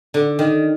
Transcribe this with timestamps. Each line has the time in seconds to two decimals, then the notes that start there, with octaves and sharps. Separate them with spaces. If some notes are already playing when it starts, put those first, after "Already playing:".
0.14 D3
0.39 D#3